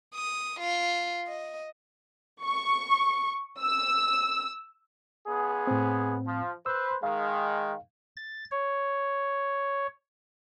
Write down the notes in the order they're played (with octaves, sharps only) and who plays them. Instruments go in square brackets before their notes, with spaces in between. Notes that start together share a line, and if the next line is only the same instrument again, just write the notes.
[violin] D#6
F4
D#5
[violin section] C#6
E6
[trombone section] C#2 B3 G#4
[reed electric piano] A2 C4
[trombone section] F3
[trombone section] B4 C5 [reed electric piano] E6
[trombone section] D#3 G#3 [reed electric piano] F5
[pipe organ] A6
C#5